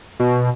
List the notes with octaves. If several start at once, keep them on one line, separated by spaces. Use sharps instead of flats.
B2